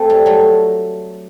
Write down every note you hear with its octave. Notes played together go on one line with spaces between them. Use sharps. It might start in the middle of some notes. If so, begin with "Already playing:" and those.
Already playing: A3 C4
G3
F#3 A3